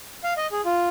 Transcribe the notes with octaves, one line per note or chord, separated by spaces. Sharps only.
F5
D#5
G#4
F4